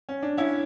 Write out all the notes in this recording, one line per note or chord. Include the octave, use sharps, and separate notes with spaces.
C#4
D4
C#4 E4